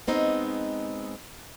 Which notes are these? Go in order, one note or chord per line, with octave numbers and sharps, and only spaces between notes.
G#3 B3 C4 D#4